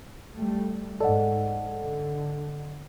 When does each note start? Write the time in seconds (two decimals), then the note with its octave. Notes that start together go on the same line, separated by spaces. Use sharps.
0.36 G3 A3
1.00 G#2 A4 D5 D#5 F#5
1.81 D3